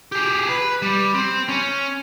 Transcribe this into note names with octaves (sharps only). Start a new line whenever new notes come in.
G4 G#4
B4
G3
C4
C#4